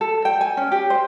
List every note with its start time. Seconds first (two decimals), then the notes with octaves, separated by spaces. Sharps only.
0.01 A4
0.25 G5
0.41 G#5
0.57 C#4
0.72 G4
0.90 C5